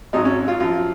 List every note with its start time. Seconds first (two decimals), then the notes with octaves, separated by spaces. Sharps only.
0.13 G#1 G#2 F#3 D#4
0.25 C#4
0.48 F4
0.60 F#2 F3 F4